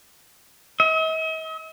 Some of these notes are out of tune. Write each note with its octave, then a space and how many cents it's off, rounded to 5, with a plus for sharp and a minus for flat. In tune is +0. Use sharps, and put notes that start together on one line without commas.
D#5 +45